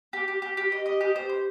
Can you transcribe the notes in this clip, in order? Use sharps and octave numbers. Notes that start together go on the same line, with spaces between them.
G4
G4
G4
G4
D#5
D#5
G4
C5
C5